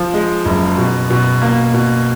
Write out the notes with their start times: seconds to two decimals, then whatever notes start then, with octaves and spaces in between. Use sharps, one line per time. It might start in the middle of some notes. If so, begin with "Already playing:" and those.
Already playing: F3
0.14 G#3
0.45 F#1
0.78 B2
1.10 B2
1.42 A#3
1.74 B2